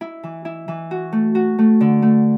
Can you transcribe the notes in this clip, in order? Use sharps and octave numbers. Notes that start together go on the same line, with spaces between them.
E4
E3
E4
E3
F#4
A3
F#4
A3
D3
A3